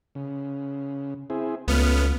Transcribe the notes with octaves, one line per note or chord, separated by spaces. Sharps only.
C#3
C4 E4 G#4
C#2 A3 B3 C#4 F4 F6